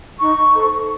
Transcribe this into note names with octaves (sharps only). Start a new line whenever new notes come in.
D#4 C#6
A4 C5